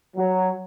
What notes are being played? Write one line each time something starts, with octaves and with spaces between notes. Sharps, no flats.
F#3